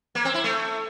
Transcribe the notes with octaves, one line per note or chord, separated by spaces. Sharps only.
A#3
C4
E4
A3